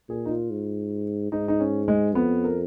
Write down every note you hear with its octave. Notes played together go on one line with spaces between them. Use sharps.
A#2 G#4
D#4
F4
G#2
G#2 D#4
D#4
C#4
G#3
F2 B3
A#4